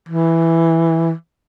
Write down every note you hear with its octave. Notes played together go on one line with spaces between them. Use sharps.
E3